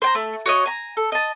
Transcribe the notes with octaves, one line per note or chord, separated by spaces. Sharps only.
C5 G5 A#5
A3
F#4 C#5 D#5
G#5 A#5
A4
D#5 A5